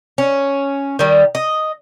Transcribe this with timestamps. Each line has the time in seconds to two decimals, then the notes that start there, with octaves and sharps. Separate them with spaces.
0.18 C#4
0.99 D#3 G3
1.35 D#5